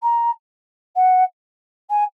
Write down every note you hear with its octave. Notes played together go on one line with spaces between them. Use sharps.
A#5
F#5
G#5